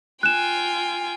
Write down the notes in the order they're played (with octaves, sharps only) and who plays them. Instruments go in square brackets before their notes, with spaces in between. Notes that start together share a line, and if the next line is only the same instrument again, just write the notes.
[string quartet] F4 G5 G#5 [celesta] F#6 E7